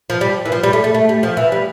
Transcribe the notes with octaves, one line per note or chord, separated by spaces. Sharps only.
F3
G3
E3
F3
G3
A3
A3
A3
G3
F3
E3
G3